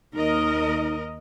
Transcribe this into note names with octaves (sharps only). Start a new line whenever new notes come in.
D#2 D#4 A#4 D#5